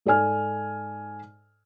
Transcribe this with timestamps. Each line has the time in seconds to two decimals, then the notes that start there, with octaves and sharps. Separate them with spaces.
0.06 G#2 A4 D5 G#5 F6